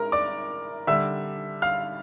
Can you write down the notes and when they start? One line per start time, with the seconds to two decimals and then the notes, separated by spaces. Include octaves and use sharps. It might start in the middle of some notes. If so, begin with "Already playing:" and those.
Already playing: G#3 A#4 A#5
0.12 D5 D6
0.87 D3 G3 E5 E6
1.62 F5 F6